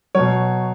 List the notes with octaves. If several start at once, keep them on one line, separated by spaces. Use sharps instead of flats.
B2 F#3 C#5